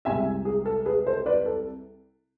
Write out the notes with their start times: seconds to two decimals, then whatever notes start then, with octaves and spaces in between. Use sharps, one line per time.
0.05 C2 C3 G#3 E5 G#5
0.45 G#4
0.65 A4
0.85 G#4 B4
1.07 A4 C5
1.26 B4 D5
1.46 A4